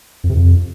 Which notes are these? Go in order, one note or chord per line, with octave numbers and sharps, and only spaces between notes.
F2
C3
F2